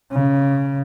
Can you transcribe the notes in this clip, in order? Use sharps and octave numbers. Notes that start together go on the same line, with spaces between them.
C#3